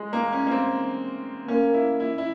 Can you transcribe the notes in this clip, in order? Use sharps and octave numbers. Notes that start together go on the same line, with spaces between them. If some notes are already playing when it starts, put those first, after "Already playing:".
Already playing: G#3
A#3
C#4
A#3
C4
A#3 C#4
E4
E4
E4